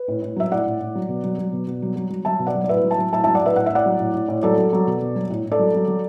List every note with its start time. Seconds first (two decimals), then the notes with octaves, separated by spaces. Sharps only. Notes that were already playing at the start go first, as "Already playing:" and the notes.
Already playing: B4
0.08 A2
0.22 A2
0.36 F#3 E5
0.51 A2 D5 F#5
0.66 A2
0.81 A2
0.95 F#3
1.09 B2
1.24 F#3
1.38 F#3
1.53 B2
1.67 B2
1.82 F#3
1.96 F#3
2.10 F#3
2.25 F#3 E5 A5
2.39 B2
2.47 D5 F#5
2.55 F#3
2.64 D5
2.69 A2 B4 E5
2.84 F#3
2.91 E5 A5
2.99 F#3
3.12 A2 E5 A5
3.24 F#3 E5 A5
3.35 D5 F#5
3.41 A2 B4 E5
3.56 A2 F#5
3.66 A2 E5
3.75 D5 F#5
3.86 F#3
4.00 A2
4.14 A2
4.28 A2
4.43 F#3 A4 D5
4.58 F#3
4.73 F#3
4.87 B2
5.01 B2
5.16 F#3
5.30 A2
5.45 A2
5.52 A4 D5
5.59 F#3
5.74 F#3
5.88 F#3